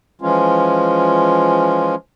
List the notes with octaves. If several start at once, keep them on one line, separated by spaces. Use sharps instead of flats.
E3 F3 G#3 C#4 F4